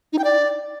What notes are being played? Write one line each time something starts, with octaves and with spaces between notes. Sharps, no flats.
D#4
G5
D5